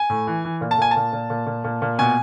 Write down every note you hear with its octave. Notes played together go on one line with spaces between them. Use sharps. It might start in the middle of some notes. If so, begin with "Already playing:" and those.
Already playing: G#5
A2
E3
E3
A#2
A5
A#2 G#5
A5
A#2
A#2
A#2
A#2
A#2
A#2
B2 G#5